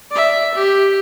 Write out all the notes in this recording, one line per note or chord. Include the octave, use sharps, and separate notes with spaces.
D5 E5
G4